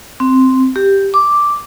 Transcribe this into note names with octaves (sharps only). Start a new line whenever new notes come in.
C4
G4
D6